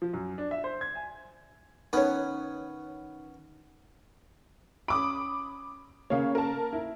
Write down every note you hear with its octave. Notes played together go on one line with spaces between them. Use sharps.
F3
F#2
D4
E5
C5
G#6
G#5
D#3 B3 C#4 D#4 B4 C#5
C#4 B5 D6 D#6 D7
C#3 A#3 C#5 F5
A#4 A5
E4